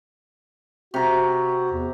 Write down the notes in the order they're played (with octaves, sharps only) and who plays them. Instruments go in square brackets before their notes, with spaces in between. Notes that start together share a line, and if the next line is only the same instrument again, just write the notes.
[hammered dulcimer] C3 A#5 [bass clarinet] F#4
[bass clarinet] E2